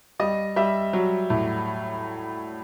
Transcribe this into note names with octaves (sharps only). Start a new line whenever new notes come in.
G3 D#5
G3 E5
F#3
A2